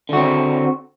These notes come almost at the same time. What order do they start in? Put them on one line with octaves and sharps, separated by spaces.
D3 F#4 C4